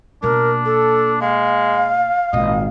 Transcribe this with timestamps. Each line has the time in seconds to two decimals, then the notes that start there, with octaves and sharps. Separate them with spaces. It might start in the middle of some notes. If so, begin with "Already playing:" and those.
0.23 B2 A#3 D4 A#4
0.65 A4
1.21 G#3 F5
2.33 G#1 A#2 D#5